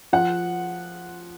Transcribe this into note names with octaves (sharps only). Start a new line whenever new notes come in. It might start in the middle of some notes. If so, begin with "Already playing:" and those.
F3 F#5